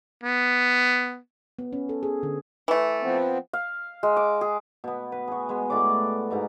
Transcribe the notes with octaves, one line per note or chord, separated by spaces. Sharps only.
B3
B3
C#4
A4
G#4
D3
E3 A3
F3 B3 C4
F5
G#3
D6
G#4
B2 B3
B4
F#4 G#4
G#3 B3
A2 F#4 D5 D6
G#2 B2 A#5